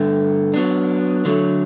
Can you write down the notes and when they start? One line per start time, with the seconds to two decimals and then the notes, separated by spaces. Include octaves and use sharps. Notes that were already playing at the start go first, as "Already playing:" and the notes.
Already playing: G2 D3 A3
0.54 F#3 B3 D4
1.25 D3 F#3 A3